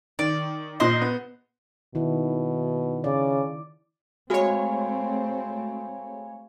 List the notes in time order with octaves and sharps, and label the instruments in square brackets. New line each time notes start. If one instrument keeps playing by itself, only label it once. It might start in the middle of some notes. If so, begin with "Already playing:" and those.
[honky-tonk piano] D#3 [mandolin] D5
[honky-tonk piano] A#2 D#5 [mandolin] C5 C6 F#6
[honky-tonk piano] B3
[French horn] B2 [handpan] D#3 E4
[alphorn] C#3 [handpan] D5
[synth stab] G#3 C#5 [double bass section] A3 C4 [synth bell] F#4 [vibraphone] F5 G#5 B5